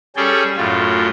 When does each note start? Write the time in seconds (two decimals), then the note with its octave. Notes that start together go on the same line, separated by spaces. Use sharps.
0.16 G3 C#4 G#4 A4 G5
0.57 F#2 A2 F4